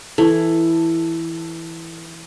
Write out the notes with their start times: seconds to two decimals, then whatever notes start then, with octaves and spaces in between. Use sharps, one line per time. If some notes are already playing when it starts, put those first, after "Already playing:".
0.18 E3 A4